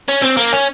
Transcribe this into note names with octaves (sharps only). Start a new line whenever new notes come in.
C#4
C4
A#3
C#4